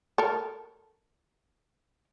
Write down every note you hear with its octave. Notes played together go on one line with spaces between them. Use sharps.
A4 A#4